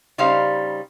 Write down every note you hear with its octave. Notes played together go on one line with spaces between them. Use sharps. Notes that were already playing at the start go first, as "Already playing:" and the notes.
C#3 G3 D#4 C5 F5